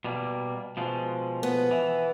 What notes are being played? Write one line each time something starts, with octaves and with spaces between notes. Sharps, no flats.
B2 G3 A#3
B2 F3 G#3
B3
E3